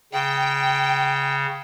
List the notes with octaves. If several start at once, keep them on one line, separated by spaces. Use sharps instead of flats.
C#3 G5